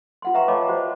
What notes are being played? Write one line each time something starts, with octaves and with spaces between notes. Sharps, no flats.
F4 F#5 C6
B4 E5 F5 G5 A#5 C#6
C#5 D#5 F5 A5 B5 D6
F#4 C5